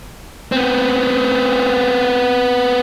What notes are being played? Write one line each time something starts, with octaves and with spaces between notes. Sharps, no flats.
B3 C4